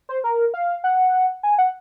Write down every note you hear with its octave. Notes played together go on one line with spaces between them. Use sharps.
C5
A#4
F5
F#5
G#5
F#5